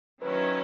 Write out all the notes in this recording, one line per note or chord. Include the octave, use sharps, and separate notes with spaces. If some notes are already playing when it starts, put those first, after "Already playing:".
D#3 F#3 C#4 E4 B4